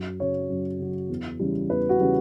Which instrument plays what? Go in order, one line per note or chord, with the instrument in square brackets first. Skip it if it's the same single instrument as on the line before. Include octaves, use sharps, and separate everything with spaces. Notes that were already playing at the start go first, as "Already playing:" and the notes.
Already playing: [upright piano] F#2
C#3 F#3 C#5
F#2
C#3 F#3
E2
C#3 E3 G3
E2 B4
F#4
C#3 E3 G3